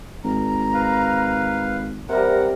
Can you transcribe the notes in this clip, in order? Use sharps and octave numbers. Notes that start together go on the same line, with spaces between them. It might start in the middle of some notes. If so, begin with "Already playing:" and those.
G#1 A#5
B4 F5
C3 G3 A#4 F#5